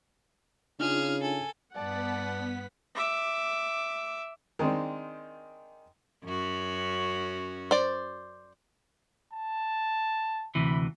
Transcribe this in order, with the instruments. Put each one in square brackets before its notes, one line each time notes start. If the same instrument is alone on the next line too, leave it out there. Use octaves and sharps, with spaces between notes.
[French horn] C#3 [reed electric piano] D4 D#4 F4 [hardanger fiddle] G#4 [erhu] F6
[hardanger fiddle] A4 [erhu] G#5
[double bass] G2 [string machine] B3 B6 [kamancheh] D5 A5 [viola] F#5
[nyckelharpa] E5 D6
[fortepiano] D#3 G#3 C4 D4
[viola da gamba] F#2 C#4 F#4
[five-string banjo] C5 D5
[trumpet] A5
[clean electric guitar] D2 C3 E3 [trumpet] B5